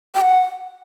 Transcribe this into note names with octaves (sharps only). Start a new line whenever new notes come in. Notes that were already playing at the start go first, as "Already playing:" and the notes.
G5
F#5